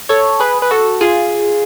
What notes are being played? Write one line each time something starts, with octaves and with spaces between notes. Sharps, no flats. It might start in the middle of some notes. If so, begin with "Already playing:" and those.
A4 C#5
G#4 B4
B4
F#4 A4
F4 G#4